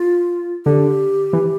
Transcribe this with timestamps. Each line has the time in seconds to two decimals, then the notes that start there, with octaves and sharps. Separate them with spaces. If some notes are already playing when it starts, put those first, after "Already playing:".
Already playing: F4
0.66 D3 G4
1.33 E3